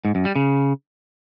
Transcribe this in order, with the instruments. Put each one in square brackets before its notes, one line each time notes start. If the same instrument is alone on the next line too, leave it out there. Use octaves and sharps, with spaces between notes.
[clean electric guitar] G#2
F#2
G3
C#3